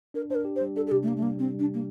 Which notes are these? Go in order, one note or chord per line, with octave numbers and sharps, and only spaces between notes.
D4 A#4
D4 A#4 C5
G4
C5
G3
D4 A4
A4
C3 G4
A3
A#3 D4
A3
G3 A#3
G3 C4
G3 D4
A#3 D4